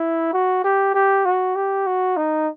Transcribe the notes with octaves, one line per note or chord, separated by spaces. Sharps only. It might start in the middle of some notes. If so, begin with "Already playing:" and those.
Already playing: E4
F#4
G4
G4
F#4
G4
F#4
D#4